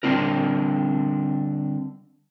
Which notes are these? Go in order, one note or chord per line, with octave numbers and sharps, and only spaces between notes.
D3 G3 C4 D4 E4 A#4